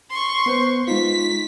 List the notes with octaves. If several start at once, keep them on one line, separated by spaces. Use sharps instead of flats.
C6 C#6
B3 B4 C5
G#3 D#4 F4 B6